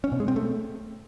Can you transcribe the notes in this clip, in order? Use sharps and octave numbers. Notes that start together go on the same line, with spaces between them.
C#4
B2
G#3
C4
A3